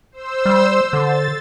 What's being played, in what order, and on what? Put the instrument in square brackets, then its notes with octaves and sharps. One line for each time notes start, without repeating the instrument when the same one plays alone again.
[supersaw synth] C5 E6
[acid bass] G3
[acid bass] D3 [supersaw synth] A6